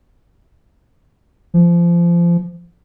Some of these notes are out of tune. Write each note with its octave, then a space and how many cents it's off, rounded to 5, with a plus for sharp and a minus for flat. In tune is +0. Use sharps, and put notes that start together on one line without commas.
F3 -25